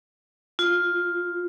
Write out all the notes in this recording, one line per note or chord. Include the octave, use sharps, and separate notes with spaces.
F4